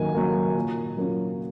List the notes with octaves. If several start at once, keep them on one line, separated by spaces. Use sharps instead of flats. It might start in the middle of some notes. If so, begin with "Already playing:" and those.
Already playing: D#3 F#3 A#3 G#5
F#3 A#3
A#2
F#3 A#3 C#4 F4